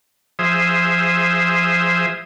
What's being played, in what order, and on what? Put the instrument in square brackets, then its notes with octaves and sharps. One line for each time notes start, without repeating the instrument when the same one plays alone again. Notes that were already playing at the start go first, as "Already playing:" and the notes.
[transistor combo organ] F3 G#4 C5 E5 D#6